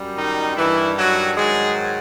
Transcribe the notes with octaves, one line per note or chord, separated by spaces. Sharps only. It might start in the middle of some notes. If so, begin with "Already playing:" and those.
Already playing: F#2 G3
D#3 D#4
G2 D#3 E3 G3 E4
F#3 F#4
G#2 D#3 F#3 G#3 G#4